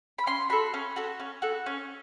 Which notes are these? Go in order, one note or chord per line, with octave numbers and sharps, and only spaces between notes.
B5
C#4 C6
F#4 A4 B5
C#4
F#4 A4
C#4
F#4 A4
C#4